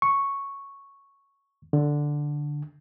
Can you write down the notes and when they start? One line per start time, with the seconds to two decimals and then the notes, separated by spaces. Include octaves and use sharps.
0.02 C#6
1.73 D3